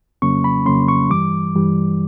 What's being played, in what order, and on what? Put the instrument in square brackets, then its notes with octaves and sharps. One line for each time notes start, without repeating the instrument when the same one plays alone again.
[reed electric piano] F2 C#3 F#3 A#3 C#4 C#6
B5
F2 C#3 F#3 A#3 C#4 C6
C#6
G2 E3 G3 D6
G2 E3 G3